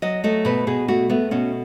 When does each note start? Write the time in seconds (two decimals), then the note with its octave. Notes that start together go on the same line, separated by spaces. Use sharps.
0.02 F#3 D#5
0.24 A3 D#5
0.45 B2 B4
0.67 B2 G#4
0.88 A3 F#4
1.09 A3 B3
1.31 B2 C#4